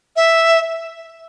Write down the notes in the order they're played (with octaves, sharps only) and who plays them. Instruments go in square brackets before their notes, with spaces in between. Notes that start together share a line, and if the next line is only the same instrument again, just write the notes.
[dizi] E5